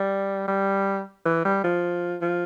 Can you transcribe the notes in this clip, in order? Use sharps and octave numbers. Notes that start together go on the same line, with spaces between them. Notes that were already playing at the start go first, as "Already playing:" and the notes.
Already playing: G3
G3
E3
G3
F3
F3